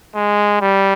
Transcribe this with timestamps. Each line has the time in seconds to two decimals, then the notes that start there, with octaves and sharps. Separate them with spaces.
0.15 G#3
0.61 G3